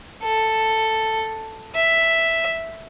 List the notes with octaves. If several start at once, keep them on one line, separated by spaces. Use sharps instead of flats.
A4
E5